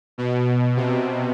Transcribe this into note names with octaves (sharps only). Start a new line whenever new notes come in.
B2
C3